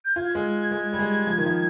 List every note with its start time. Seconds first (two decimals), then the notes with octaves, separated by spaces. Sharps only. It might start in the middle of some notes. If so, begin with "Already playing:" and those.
0.05 G6
0.16 F4 G#6
0.35 G#3
0.71 G#3
0.93 G3
0.99 G#3
1.27 F3
1.38 D#3
1.45 F3